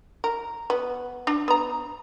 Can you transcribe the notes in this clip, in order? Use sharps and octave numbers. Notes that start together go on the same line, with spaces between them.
A#4
B3
D4
B3 A#5